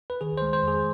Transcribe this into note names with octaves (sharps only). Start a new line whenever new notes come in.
B4
D#3 G#4
G#3 C5
C5
F2
G#4